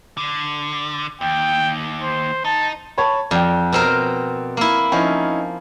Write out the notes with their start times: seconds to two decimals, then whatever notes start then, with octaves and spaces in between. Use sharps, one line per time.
0.17 D3
1.21 D#2 G5
2.02 C5
2.45 D#4 A5
2.98 C#5 A5 B5
3.31 F2 D5 G5
3.73 B2 C4 A#4
4.57 A#3 E4
4.92 F3 C#4 D#4 E4